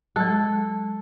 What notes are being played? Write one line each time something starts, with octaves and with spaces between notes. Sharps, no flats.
F#3 G#3 A4